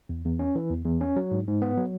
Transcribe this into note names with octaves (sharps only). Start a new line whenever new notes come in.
E2
E2
C#4
E3
E2
E2
C#4
F#3
G#2
G#2
B3
F#3